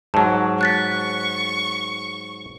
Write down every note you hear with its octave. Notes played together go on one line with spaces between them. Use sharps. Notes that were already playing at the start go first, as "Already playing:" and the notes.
G#2 F#3 A5
C#6 F#6 A6 B6